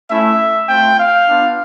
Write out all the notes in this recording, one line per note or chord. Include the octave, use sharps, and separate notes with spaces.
A3 C#4 E4 E5
A3 C4 F4 G5
F5
B3 D4 F4